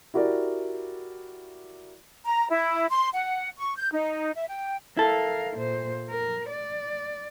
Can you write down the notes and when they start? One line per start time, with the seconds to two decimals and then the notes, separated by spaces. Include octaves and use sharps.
0.14 E4 F#4 G4 A#4 D5
2.25 A#5
2.50 E4
2.90 C6
3.14 F#5
3.58 C#6
3.76 G6
3.93 D#4
4.35 E5
4.48 G5
4.97 E4 A4 A#4 F5
5.57 A#2 C5
6.10 A#4
6.50 D5